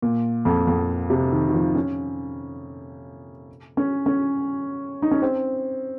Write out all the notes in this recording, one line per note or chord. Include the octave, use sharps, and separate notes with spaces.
A#2
F2
F2
C3
D#3
D#3
F3
C#4
C#4
C#4
D#4
C#4
C4